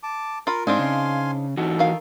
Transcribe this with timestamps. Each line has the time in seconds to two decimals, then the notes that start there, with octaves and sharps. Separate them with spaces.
0.03 A5 D6
0.47 F4 A#4 B5
0.67 G#2 C4 D4 D#4 F5 G#5 C6
0.79 C#3
1.57 E3 D#4 F#4 A4
1.79 D#3 F5